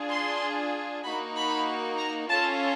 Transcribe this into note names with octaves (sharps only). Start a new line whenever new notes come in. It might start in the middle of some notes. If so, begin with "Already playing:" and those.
Already playing: D4 F4 G#4
C6
A#3 D#4 F#4 B5
B5
A#5
C#4 F4 A4 A5